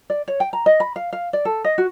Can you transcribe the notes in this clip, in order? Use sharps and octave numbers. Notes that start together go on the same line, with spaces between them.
D5
C#5
G5
A#5
D#5
B5
F5
F5
D5
A4
D#5
F#4